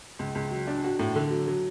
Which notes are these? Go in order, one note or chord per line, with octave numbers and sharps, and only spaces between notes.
C#2
C#2
F#3
D4
F#4
A2
D3
F#3
F#3